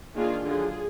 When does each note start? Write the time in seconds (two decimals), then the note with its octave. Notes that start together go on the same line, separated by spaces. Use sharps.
0.15 D#3 A#3 D4 F4 G#4
0.44 D3 F#3 D4 F4 G#4